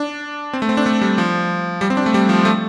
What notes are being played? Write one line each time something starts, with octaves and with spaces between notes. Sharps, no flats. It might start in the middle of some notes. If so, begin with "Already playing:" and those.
Already playing: D4
C4
A3
C4
D4
A3
G3
F3
G3
C4
D4
A3
G3
F3
A3